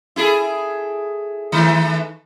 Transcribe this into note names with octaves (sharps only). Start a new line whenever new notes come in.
E4 G#4 A4
D#3 E3 A3